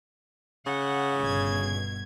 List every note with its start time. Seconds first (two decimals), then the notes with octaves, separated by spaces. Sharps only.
0.67 C#3 F#5
1.20 G1 B2 G#6